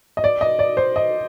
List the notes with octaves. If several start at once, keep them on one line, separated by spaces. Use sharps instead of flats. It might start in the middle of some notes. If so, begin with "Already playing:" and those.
D#5
D5
D#5
D5
C5
D#5